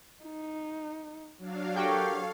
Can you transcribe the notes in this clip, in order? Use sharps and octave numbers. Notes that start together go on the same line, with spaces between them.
D#4
F#3 D4 F5
F#4 G4 A4 A#4 C#5 F5 G5